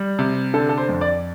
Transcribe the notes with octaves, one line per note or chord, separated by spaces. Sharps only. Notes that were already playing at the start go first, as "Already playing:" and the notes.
Already playing: G3
C3
D3 A4
A4
C5
F2
D5